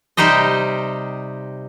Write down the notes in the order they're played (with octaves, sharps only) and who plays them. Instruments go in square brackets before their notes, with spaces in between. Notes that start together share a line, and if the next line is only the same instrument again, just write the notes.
[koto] C3 G3 D#4 G4 C5 D#5